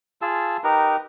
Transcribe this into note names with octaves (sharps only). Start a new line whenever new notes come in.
F4 G#4 A5 E6
D#4 G4 A#4 B4